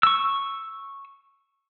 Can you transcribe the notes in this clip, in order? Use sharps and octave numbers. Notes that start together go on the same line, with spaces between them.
C#6 E6